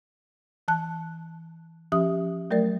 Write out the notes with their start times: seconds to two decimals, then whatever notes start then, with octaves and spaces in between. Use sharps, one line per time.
0.68 E3 A5 F#6
1.92 F3 C#4 G4 E5 D#6
2.51 F#3 A3 A#4 D5 A6